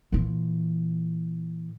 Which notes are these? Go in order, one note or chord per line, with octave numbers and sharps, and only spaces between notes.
A#2 E3